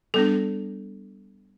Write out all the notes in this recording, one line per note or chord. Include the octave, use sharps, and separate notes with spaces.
G3 B3 D4 A4